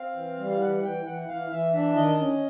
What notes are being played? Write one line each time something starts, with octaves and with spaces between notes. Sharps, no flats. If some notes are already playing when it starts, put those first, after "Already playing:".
Already playing: C4 F5
E3
G3
F5
E3 F#5
E3 G5
E3 F#5
E3 F5
E3 E5
D4 E5
D#3 D#5
C#4